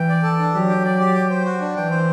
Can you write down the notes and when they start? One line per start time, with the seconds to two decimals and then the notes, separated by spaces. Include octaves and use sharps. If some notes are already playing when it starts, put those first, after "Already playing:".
Already playing: E3 G5
0.09 D5
0.23 A4
0.39 D4
0.54 F#3 G4
0.69 G5
0.84 D5
0.99 G4
1.14 G5
1.30 C5
1.46 F#4
1.60 D4
1.75 E3 G5
1.91 C5